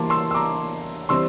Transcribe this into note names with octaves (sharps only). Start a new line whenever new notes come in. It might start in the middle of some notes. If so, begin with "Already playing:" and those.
Already playing: E3 G3 A#3 A5 C6 D6
C6 E6
E6
A#5 D6
E3 G3 C4 C6 E6